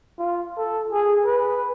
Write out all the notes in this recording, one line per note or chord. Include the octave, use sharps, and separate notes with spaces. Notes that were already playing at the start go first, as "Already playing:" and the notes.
F4
A4
G#4
B4